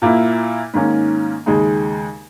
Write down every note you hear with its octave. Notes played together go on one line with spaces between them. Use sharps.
A#2 A#3 E4
G#2 D#3 A#3 C#4
D#2 C#3 G#3 D#4